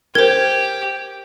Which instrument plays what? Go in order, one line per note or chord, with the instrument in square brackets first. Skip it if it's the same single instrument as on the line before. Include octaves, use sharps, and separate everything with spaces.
[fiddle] G4 [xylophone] A#4 C5 [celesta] G#6